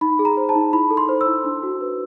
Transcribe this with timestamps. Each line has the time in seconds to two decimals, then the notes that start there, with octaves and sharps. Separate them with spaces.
0.01 D#4 B5
0.19 G#4
0.25 A#5
0.37 C5
0.49 A5
0.55 D#4
0.73 E4 B5
0.90 A4
0.97 C6
1.09 C5
1.21 E6
1.27 E4
1.45 D4
1.63 F#4
1.81 B4